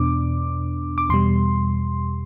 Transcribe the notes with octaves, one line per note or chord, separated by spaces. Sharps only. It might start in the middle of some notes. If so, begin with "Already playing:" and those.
Already playing: E2 B2 B3 D4 D6
D6
E2 B2 G3 C6